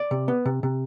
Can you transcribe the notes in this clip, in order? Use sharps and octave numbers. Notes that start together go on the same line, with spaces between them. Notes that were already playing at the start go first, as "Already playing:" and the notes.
Already playing: D5
C3
B3
C3
C3